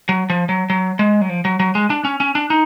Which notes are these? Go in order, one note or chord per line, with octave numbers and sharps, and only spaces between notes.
F#3
F3
F#3
F#3
G#3
F#3
F3
F#3
F#3
G#3
D4
C#4
C#4
D4
D#4